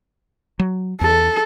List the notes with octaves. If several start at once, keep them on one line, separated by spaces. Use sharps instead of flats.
F#3
E2 A4